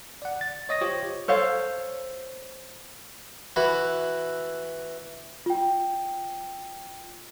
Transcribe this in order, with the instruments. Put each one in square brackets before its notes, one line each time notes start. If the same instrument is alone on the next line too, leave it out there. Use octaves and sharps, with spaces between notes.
[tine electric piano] D5 F#5
A6
C#5 D#5 D#6 A#6
F4 G4 C5 C#5
[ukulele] A4 C5 C#5 F5
[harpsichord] E3 E4 F#4
[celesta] F4 G5